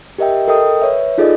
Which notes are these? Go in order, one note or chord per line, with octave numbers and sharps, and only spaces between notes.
G4 A#4 D#5 E5 G5
A4 A#4 D#5 G5 D#6
B4 C#5 E5
D#4 F4 G#4 A4 D5 D#5